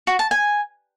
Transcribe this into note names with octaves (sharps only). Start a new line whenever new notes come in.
F#4
A5
G#5